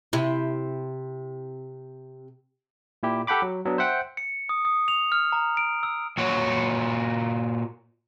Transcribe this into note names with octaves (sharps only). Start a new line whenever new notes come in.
C3 E4
A#2 E4 G4
G4 A4 F#5 G5 B5 D6
F#3
F#3 B3 D4
C5 E5 F#5 G5
C#7
D#6
D#6
F7
F6
A#5
D7
E6
A#2 F#4 C#5